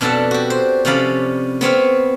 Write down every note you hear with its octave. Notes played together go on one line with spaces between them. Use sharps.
F2 B2 D4 A4 F#5 A5
F#4 G4
C5
C3 F3 C#4 D5 F5 B5
B3 C4 C#5 F5